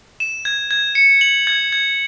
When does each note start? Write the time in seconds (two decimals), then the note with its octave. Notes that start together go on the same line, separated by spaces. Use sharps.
0.20 E7
0.45 G#6
0.71 G#6
0.95 C#7
1.21 F#7
1.47 G#6
1.72 G#6